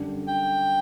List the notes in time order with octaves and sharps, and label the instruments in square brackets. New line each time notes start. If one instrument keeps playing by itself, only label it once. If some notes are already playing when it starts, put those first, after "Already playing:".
Already playing: [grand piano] F#2 D3 G3 D4
[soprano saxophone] G5